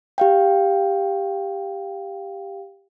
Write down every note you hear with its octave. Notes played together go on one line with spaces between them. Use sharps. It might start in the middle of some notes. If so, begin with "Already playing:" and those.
G4 F5 G5